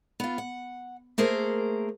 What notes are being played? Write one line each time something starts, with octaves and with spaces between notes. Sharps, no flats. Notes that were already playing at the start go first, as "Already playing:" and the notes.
B3 F4
F#5
A3 A#3 G#4 A#4 C5